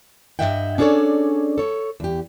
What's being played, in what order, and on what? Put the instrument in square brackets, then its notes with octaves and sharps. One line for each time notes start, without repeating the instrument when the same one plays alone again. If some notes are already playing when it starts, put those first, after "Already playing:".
[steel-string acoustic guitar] G2 F3 D#5 E5 F#5 G5
C#4 D4 G#4 A4 C#5 D5
A4 C#5
E2 G4